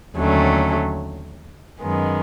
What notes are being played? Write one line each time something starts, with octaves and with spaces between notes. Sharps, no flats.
D#2 D3 F#3 A3 C#4
F#2 D#3 G#3 B3